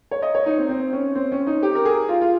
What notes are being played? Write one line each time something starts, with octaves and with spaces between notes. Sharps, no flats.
C#5
D#5
C#5
D#4
C4
C4
C#4
C4
C#4
D#4
G4
A#4
G#4
F4
F4